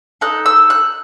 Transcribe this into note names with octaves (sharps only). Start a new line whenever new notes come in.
D#4 A4 F#6
E6
F#6